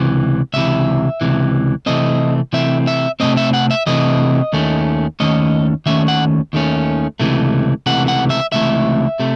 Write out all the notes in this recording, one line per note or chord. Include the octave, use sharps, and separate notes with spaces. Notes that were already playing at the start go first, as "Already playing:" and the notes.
Already playing: C#2 C3 E3
C#2 C3 E3 E5
C#2 C3 E3
C3 E3 A3 C4 D#5
C3 E3 A3 C4 E5
E5
C3 E3 A3 C4 D#5
E5
F#5
E5
C3 E3 A3 C4 D#5
D#2 D#3 A3 C#4
D#2 D#3 A3 C#4 D#5
D#2 D#3 A3 C#4 E5
F#5
D#2 D#3 A3 C#4
C#2 C3 E3 A3
C#2 C3 E3 A3 F#5
F#5
E5
C#2 C3 E3 A3 E5
C3 A3